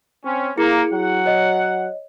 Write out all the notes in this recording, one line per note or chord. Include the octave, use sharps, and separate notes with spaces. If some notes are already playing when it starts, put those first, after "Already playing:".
C4 C#4
A#3 E4 G#4 C#7
F#3 F#5
C#5 D#5